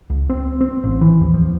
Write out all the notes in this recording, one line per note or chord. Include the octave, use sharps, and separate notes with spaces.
C#2
C4
C4
A1
E3
D#2
F3